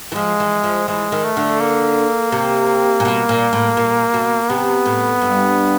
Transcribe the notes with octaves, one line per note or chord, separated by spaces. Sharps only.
E3
F3 G#3
E3
F3
E3 G#3
D#3
A3
D3
A#3
C3
A#2
B2
A#2
A2
A#2
B2
C3 B3
A2
G2